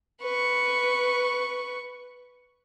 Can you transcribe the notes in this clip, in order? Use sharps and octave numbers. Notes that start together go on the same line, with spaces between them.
B4 C#6